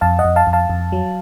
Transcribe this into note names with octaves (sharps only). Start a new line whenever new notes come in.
F2 F5 A5
D#5 F#5
F2
F5 A5
F2
F5 A5
F2
F#3